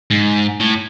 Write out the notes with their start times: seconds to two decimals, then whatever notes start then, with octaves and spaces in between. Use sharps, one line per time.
0.11 G#2
0.60 A2